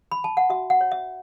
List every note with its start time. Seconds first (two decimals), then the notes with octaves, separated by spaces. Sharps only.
0.12 B5
0.24 A5
0.37 F#5
0.50 F#4 E5
0.70 F#5
0.81 C#5
0.92 E5